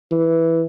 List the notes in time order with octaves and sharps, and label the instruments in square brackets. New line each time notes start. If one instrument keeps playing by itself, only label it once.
[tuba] E3